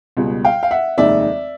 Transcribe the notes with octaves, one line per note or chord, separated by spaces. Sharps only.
C#2 B2 G3
F5 G5
F5
E5 F#5
F1 D#2 D#3 G#3 D5 E5